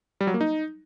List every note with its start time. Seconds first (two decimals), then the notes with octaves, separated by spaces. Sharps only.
0.21 G3
0.27 F#3
0.34 A#3
0.41 D#4